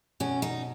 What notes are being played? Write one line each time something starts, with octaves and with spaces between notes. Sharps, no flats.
B2 C#4
D#4